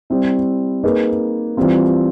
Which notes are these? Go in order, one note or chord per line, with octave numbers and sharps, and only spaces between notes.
G3 C4 E4
A#3 D#4 G#4 B4
E3 G3 C4 F4